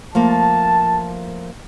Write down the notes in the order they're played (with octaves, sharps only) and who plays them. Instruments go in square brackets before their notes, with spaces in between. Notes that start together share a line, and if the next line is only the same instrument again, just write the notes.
[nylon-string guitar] F3 A3 A#3 [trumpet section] A5